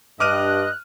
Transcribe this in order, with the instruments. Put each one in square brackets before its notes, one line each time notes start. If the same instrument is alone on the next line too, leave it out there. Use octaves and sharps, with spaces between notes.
[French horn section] G2 [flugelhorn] D#5 [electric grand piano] D6 F6 D#7 [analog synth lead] F#6